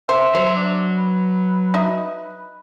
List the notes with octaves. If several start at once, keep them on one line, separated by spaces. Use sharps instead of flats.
C5 E5
F#3 C5
D4
B4
D#4 D#5 E5